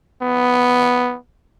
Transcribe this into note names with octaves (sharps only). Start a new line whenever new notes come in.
B3